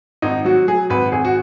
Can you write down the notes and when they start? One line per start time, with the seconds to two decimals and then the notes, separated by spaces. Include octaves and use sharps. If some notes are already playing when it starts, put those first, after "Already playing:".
0.22 G#1 D#4
0.45 F#3 F#4
0.67 F#3 G#4
0.90 G#1 B4
1.12 G#1 G#4
1.25 F#4